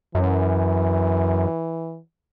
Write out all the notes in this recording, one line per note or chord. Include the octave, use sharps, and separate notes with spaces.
F#2 E3